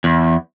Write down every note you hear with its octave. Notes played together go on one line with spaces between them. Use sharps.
E2